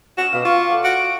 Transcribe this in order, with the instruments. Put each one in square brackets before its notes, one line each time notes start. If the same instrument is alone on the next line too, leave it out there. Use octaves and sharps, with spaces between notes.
[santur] C#4 D#5 [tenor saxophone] F#4 [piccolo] E7
[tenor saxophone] B2 [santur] F5 D6
[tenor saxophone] F4 [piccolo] C#6
[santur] A3 D5 F#5
[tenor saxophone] F#4 [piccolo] D7